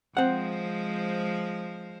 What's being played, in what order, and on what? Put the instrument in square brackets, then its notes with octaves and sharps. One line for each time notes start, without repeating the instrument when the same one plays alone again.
[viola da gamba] F3 G#3 C5 [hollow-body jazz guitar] C4 F#5